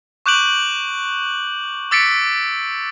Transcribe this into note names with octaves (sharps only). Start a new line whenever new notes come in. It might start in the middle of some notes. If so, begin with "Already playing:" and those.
C#6 D6 F#6 G6 D7 F#7
D6 E6 A6 B6 C#7 D7